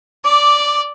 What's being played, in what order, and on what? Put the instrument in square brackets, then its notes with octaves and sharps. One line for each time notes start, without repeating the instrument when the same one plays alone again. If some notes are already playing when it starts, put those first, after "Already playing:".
[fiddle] D5 [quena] D6